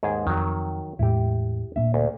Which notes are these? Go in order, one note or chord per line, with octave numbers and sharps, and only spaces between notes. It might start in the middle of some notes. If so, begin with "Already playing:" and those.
D#2 G#2 G#4
F2 D#3 F#3
E2 A2 G#3 E4 G4
A#2 A#3 D4 E5
D2